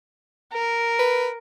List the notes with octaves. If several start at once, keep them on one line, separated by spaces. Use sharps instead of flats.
A#4
B4